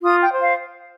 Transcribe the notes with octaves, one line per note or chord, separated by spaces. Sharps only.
F4 D#6
G5
C5
F5